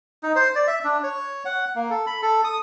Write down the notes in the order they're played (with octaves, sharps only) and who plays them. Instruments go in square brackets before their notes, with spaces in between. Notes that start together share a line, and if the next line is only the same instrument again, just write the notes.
[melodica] D#4
C5
D5
E5
D4
C#5
F#5
A#3
A4
B5
A4
D#6